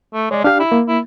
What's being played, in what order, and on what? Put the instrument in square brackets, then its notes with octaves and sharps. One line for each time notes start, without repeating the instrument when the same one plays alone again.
[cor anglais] A3
[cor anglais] G#3 [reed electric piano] C#5 D5
[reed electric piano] D4 G4 [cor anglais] F5
[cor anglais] E4
[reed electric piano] A#3
[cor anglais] E4